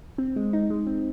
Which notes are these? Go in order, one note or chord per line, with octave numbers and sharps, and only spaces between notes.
C4
G#3
D#4
G#3
C4